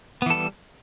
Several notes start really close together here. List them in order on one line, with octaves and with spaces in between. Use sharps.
B3 E3 A4 G3